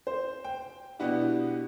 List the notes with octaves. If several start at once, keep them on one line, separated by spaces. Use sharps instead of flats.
C5
G5
B2 B3 D4 E4 F#4 G4